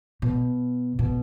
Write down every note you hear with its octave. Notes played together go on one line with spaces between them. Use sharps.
B2
B2